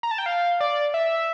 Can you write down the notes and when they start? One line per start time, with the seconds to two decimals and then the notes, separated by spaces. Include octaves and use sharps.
0.03 A#5
0.11 A5
0.18 G5
0.26 F5
0.60 D5
0.94 E5